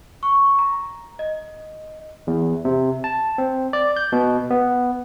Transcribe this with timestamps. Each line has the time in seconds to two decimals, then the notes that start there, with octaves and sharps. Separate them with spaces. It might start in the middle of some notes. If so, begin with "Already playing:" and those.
0.23 C#6
0.59 A#5
1.19 D#5
2.27 E2
2.65 C3
3.04 A5
3.38 C4
3.73 D5
3.96 G6
4.12 B2
4.50 B3